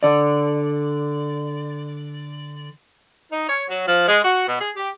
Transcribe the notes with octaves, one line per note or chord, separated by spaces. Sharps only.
D3 D5
D#4
C#5
F#3
F3
G#3
F#4
B2
G#4
G4